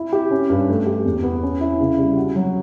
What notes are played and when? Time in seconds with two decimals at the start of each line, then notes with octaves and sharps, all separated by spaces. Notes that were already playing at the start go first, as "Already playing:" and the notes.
Already playing: E4
0.13 G4
0.31 C#4
0.50 G2
0.69 A3
0.86 G4
1.05 E2
1.23 B3
1.43 C#4
1.61 E4
1.80 C#3
1.98 G3
2.17 F#4
2.36 F#3